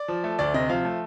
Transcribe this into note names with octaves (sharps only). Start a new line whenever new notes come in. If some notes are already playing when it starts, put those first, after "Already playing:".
Already playing: D5
F3
A3
D2 D5
C3 D#5
F3 F5
A3